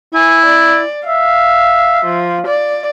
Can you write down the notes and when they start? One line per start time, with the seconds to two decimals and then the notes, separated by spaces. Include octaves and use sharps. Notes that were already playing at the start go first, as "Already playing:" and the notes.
0.14 E4 G#5
0.46 D5
1.07 E5 F5
2.05 F3
2.47 D5